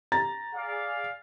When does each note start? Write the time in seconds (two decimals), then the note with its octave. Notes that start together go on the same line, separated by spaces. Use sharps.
0.12 A#5 A6
0.55 G#4 D5 F5